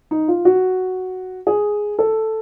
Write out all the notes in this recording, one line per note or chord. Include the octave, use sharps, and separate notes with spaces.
D#4
F4
F#4
G#4
A4